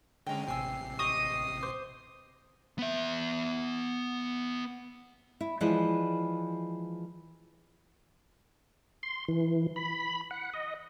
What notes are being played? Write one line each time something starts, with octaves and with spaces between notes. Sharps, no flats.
D3 G#3 C#4 G5 A#5
A1 C3 G5 G#5 E6 C7
G4 D#5 C#6 D#6
C5 D6
B3 E5
E4
E3 F3 G#3 B4 D5
C6
E3
B5
F#5
D#5